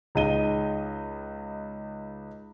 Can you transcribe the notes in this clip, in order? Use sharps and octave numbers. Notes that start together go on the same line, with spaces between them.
C#2 G#3 D#4 D#7 G7